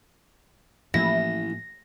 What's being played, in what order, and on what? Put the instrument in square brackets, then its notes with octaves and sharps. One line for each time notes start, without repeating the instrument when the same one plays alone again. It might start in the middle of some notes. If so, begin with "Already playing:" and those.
[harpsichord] A1 [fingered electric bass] A2 F3 A#3 [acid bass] E4 [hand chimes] A#6